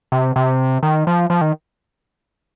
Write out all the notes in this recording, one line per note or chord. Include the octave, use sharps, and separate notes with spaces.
C3
C3
D#3
F3
F3
D#3